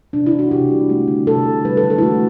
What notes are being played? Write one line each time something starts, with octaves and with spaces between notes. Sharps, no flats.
C3 D4
E4
C3
F#4
C3 G4
G3
A3
D3
C3 A4
C3
G3 B4
A4
D3
A4
E4
A3 F#4